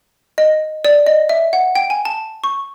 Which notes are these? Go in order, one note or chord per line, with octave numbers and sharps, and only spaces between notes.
D#5
D5
D#5
E5
F#5
G5
G#5
A5
C#6